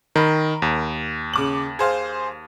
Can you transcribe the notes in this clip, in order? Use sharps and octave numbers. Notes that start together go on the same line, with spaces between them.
D#3 A#4 B5
D#2
C#3 D6 F#7
G#4 C5 F5